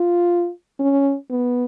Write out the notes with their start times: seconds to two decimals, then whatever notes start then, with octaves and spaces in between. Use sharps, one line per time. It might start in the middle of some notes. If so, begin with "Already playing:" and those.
Already playing: F4
0.80 C#4
1.30 B3